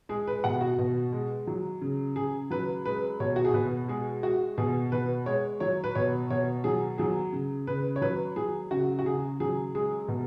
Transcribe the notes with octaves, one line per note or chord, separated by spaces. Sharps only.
G#3 G#4
B4
B2 F#5
F#4
B2
G#3
F#3
C#3
C#3 G#4
F#3 B4
G#3 B4
B2 C#5
F#4
G#4
B2 B4
G#3 G#4
G#3 F#4
B2 G#4
B2 B4
G#3 C#5
F#3 C#5
B4
B2 C#5
B2 C#5
F#3 G#4
F#3 G#4
C#3
C#3 B4
C#5
F#3 B4
F#3 G#4
C#3 F#4
F#4
C#3 G#4
F#3 G#4
G#3 G#4
B2